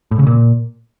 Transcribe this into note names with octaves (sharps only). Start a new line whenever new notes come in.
A2
C#3
A#2